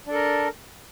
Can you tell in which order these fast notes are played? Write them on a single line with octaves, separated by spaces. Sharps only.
D4 A4 A#4